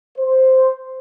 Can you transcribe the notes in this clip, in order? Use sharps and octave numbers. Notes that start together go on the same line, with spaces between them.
C5